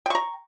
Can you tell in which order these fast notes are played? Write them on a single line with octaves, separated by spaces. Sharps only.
G5 C#6 A#5